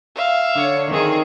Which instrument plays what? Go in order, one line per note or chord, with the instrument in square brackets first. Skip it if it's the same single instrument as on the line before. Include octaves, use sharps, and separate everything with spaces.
[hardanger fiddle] E5 F5
[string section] D3 C#5
[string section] D#3 [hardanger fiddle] C4 G#4